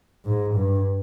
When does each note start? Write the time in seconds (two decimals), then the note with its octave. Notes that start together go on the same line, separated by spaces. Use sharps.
0.25 G#2
0.55 G2